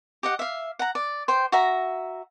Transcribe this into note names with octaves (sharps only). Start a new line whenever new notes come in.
G4 D#5 F#5
E5 F5
F#5 A#5
D5
C5 G5
F#4 E5 A#5